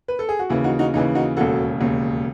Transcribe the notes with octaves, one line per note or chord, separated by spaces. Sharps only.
B4
A4
G#4
F#4
D#2 C#3 E3 E4
D#4 F#4
D#4 F#4
D#2 C#3 E3 D#4
D#4 F#4
E1 D#2 C#3 F#4 A4
E1 D#2 C#3